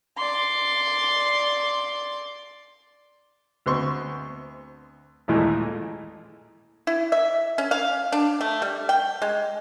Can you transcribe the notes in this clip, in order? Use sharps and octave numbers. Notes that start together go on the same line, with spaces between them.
D5 C6
D2 B3 C4 C6 C#6
A1 D#2 A#2 E3 G#3 A3
E4
E5
C#4
F5
D4
A3
G3
G5
G#3